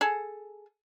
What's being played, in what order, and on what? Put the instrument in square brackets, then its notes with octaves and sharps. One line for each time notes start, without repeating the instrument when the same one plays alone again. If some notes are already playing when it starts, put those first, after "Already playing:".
[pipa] G#4 A4